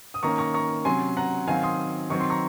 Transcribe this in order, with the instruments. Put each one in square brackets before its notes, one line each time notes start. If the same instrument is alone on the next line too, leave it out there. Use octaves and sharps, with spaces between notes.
[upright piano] D#6
D#3 A#3 C#4 A#5 C#6
A#5 C#6
A#5 C#6
C3 F#3 C#4 G#5 C6
F#5 A#5
D#3 F#3 C4 F5 G#5
C6 D#6
D#3 F#3 C4 C#6
C6
A#5 C#6